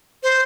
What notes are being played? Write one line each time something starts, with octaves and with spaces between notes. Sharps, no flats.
C5